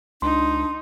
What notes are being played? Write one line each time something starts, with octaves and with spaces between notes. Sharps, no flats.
C#2 D4 D#4 C6